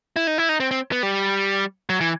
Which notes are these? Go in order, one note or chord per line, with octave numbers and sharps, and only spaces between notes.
E4
D#4
E4
D#4
C4
C4
B3
G3
F#3
E3